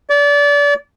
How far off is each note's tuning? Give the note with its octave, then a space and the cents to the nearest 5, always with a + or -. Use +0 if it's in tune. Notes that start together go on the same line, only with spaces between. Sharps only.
D5 -30